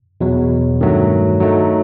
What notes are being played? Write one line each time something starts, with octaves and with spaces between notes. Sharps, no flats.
E2 B2 F#3
G2 D#3 F#3 A3
F#3 A3 D#4